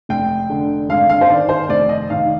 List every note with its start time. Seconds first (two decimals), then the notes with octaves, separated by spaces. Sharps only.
0.09 F1 G5
0.50 D3
0.89 G#1 F5
1.09 F5
1.21 C5
1.29 D#3 D5
1.49 C5
1.69 F1 D5
1.89 D#5
2.09 D#3 F5